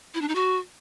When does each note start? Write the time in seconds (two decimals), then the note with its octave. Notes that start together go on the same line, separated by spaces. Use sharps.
0.14 E4
0.21 D4
0.28 D#4
0.35 F#4